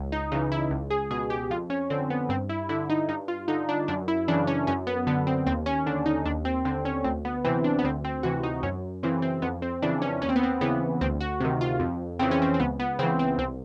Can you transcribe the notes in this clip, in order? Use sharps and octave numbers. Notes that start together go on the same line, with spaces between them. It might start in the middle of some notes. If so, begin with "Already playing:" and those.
Already playing: C#2
D#4
C#3 E3 D#4
E4
C#2
G#4
B2 G#4
G4
F2 F4
C#4
D3 C4
B3
G2 C4
E4
D3 E4
D#4
G2 D#4
F4
D3 D#4
D4
F#2 D4
E4
C#3 E3 D4
C#4
F#2 C#4
B3
D3 B3
C4
D#2 C4
C#4
D3 D4
D#4
D#2 D4
C4
D3 C4
C#4
D2 C4
B3
C3 E3 C4
D4
B3
D2 C4
C4
C3 E3 F#4
D#4
F#2 C#4
C#3 E3 C4
C4
F2 B3
C4
C#3 E3 D4
C#4
D#2 C#4
C4
B3
C4
C#3 E3 B3
D2 C4
F#4
C3 D#3
F4
F2
C#3 E3 C4
C#4
C4
C4
C#2 B3
B3
C#3 E3 C4
C4
C2 C4